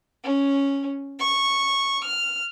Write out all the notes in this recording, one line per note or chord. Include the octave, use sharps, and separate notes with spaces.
C#4
C#6
F6